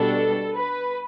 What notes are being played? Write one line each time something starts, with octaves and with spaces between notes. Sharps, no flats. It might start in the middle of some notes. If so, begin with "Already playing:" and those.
Already playing: B2 G3 D4 A4
B4